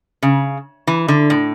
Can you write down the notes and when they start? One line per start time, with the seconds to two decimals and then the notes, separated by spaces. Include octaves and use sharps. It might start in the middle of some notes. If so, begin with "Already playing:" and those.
0.22 C#3
0.87 E3
1.08 D3
1.30 A2